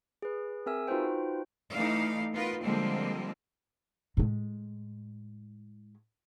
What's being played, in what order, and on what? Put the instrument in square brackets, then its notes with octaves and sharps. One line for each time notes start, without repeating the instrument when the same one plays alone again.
[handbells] G#4 B4
C4 G#4 A#4 E5 G#5 E6
D#4 F4 F#4 B4 C5 G5
[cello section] E3 A3 D#4 D5 F5
B3 D#4 F4 A#4 B4
D3 F3 G3 G#3 A#3 C4
[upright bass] A2 G#3